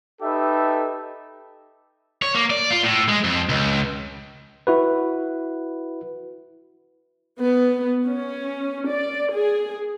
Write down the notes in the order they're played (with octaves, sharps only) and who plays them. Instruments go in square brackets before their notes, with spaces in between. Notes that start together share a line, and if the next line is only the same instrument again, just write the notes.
[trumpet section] D#4 G4 A4 B4 E5
[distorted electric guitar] C#5
A#3
D5
F4
A2
G#3
F2
C#2
[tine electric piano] E4 F#4 B4
[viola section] B3
C#4
D5
G#4